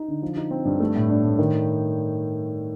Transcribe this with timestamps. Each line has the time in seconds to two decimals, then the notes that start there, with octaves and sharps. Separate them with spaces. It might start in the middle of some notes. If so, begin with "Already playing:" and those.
Already playing: D#4
0.08 D3
0.22 F3
0.37 D#4
0.51 C4
0.65 G2
0.80 A3
0.95 A2
1.10 D4
1.24 A2
1.38 D#3